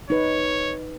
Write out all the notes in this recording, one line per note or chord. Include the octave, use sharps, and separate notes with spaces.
D#4 B4 C#5